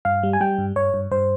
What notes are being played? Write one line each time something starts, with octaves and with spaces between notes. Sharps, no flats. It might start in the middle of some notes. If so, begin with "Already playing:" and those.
G2 F5
G3
G#5
G3 G5
G2
G2 C#5
G2
G2 C5